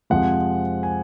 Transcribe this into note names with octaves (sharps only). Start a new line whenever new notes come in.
F2 C3 F3 G#3 F#5
G#5